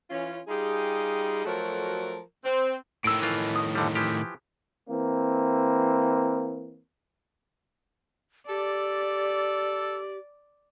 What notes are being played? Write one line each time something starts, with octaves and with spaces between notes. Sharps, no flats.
E3 C#4 F4
G3 D#4 F4 G4 G#4
F3 F#3 A3 F#4 A4 A#4
C4
A2 D#3 E6 D7
E3 F4
D#6
F2 D3 G3
E3 F3 G4
E3 A#3 C4
G4 A4 D5